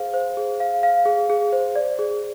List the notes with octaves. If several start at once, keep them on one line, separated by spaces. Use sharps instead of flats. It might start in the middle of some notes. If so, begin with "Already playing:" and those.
Already playing: G#4 C5 F5
C5
G#4
F5
F5
G#4
G#4
C5
D5
G#4